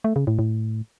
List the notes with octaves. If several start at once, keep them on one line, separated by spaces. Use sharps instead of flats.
A3
C#3
A2
A2